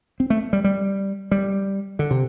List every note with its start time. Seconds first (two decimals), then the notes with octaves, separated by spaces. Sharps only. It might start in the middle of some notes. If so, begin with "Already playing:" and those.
0.20 C4
0.30 A3
0.53 G3
0.64 G3
1.31 G3
1.99 D3
2.11 C3